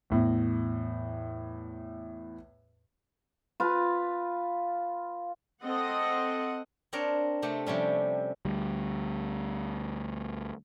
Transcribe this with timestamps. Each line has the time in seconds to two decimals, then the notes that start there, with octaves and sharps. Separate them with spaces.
0.10 E2 A2
3.60 F4 B4
5.62 C4 A4 D#5 F#5
6.93 C4 D4 A#4 C#5
7.42 C3 A3 G4
7.67 C3 F3 G3 C#4
8.45 D2 G3